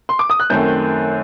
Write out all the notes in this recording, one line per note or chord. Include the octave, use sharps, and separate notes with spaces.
C6
D6
D#6
F#6
F#2 D#3 A3 C4 G6